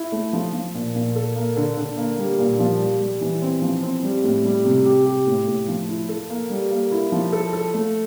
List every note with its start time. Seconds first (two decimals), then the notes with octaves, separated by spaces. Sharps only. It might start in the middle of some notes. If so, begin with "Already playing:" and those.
Already playing: E4
0.12 A3
0.33 F3
0.53 F3
0.74 A#2
0.95 A#2
1.15 A4
1.36 A#3
1.56 D3
1.77 D3
1.97 A#3
2.18 G3
2.39 A#2
2.59 F3
2.80 G3
3.01 G3
3.21 E3
3.42 C4
3.62 F3
3.83 C4
4.03 G3
4.24 A2
4.44 G3
4.65 C3
4.86 G4
5.06 G4
5.27 A2
5.47 A2
5.68 F3
5.88 E4
6.09 A4
6.30 A#3
6.50 G3
6.71 A#3
6.91 E4
7.12 F3
7.33 A4
7.53 A4
7.74 A3